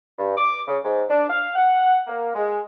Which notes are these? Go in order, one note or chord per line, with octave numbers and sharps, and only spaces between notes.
G2
D6
C#3
G#2
D4
F5
F#5
A#3
G#3